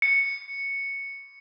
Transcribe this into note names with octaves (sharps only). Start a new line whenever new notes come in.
C#7